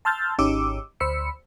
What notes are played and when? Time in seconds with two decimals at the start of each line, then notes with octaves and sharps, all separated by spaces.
0.05 A5 C6 E6 F6 G6 A6
0.39 G#1 C#4 D#4 G4 D6 E6
1.00 D2 C5 B5 E6 C#7